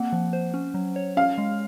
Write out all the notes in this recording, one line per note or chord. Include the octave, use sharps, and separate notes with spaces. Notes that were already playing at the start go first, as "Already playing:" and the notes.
Already playing: A#3 C4 F#5
F3
C5
C#4
F#3
C#5
C#4 F5
G#3